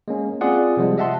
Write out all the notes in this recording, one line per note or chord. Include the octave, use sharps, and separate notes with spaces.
G#3 A#3 C#4
C4 F4 G#4 D5 F#5
C3 F3 G3 G#3
D#5 E5 F#5 A5 C6